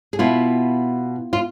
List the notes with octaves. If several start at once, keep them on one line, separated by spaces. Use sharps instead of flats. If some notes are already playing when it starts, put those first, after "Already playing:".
G#4
B2 B3 E4 F4
F4